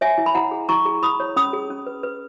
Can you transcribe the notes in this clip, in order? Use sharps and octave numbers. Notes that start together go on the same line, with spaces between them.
C#5 E5 G#5
E4
B5
E4 F#5 A#5
G#4
E4 A#5 C#6
G#4
E4 B5 D#6
C#5
C#4 B5 D#6
G#4
C#4
B4
B4